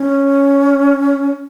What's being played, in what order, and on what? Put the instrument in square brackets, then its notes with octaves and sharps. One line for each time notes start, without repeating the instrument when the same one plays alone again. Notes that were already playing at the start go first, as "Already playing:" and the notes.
Already playing: [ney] C#4